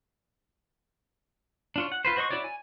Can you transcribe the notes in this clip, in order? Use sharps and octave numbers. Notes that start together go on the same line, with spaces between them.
D4 F4 C#5
F#5
F4 B4 C5
F#4 C5 D#5 C6 C#6
E4 F#4 C#5 D5
G#5